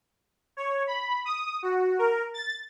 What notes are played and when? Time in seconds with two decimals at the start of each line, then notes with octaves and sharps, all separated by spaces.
0.57 C#5
0.87 B5
1.25 D#6
1.63 F#4
1.99 A#4
2.34 A6